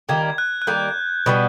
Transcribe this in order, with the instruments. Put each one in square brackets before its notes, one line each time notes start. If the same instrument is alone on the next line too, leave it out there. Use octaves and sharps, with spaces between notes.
[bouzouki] D#3 G3 A#3 [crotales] G#6
[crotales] F#6
F#6
[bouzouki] D#3 G3 A#3 [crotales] G6
[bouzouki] B2 G3 B3